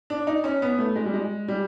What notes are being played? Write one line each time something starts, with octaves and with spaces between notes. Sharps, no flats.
D4
D#4
C#4
B3
A3
G#3
G3
G#3
G3